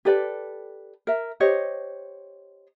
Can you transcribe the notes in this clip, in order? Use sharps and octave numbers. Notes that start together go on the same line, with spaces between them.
G4 A4 B4 D5
A#4 E5
G4 C5 C#5 D#5